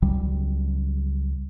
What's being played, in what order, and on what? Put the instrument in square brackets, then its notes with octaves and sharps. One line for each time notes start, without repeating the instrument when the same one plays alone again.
[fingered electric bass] C#2 C#3 F#3 G3